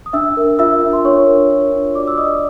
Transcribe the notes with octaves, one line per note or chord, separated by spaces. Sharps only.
D#6
D4 E5 E6
A#4
F4 E5 E6
D4
C6
D4 C#5 C#6
A#4
F4
D4
F#4 D5 D6
E6
D5 D#5 D#6